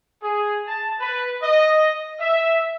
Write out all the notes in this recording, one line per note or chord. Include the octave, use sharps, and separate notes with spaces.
G#4
A5
B4
D#5
E5